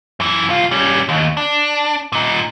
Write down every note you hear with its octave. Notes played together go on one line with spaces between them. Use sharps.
F#2 E3
C2 F4
G3 C#4
D#2
D4
A#2 D#4